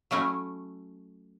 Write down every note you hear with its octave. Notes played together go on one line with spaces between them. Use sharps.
F#3 A3 C#4 E4